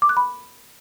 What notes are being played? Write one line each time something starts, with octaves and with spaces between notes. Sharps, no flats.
D6
F#6
B5